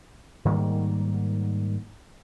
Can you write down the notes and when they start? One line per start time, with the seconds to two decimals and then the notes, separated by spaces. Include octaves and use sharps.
0.45 G#2 D#3 G3 A#3